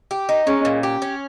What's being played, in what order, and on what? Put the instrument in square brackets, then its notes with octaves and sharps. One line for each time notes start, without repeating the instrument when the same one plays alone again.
[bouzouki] G4
D#4
[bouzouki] G#3 [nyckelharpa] C#4
[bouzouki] A#2
G4
C#4